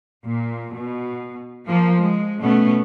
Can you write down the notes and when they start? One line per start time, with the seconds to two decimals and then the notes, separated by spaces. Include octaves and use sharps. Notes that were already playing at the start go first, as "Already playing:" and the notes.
0.24 A#2
0.74 B2
1.67 F3 A#3
2.00 G#3
2.41 B2 A3 B3 C#4